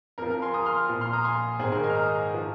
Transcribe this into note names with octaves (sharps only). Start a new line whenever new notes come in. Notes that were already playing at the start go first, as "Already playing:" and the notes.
F2 F3 A#4
A#4
G#5 C6
A#5 D#6
C6 F6
A#2 F3
C6 F6
A#5 D#6
G#5 C6
G#2 G#4 C5
D#3
A#4
D#5 G#5
F6
A#5 D#6
F3